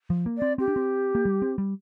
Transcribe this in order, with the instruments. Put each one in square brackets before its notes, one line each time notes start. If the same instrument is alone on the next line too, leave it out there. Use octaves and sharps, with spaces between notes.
[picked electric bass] F3
A#3
[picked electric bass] C4 [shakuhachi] D5
[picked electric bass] C4 [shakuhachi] G4
[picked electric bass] D4
C4
A#3
G3
C4
G3